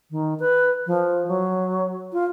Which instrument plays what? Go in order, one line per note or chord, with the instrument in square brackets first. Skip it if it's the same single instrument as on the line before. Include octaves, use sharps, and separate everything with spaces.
[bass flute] D#3
B4
F3
F#3
F4